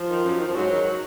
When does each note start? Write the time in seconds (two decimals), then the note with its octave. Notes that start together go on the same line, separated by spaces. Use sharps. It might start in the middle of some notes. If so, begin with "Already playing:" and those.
Already playing: F3
0.08 D#3
0.23 F#2
0.39 D#3
0.47 F3
0.54 G#2 F#3
0.70 D#3